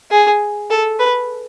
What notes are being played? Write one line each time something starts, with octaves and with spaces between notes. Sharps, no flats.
G#4
A4
B4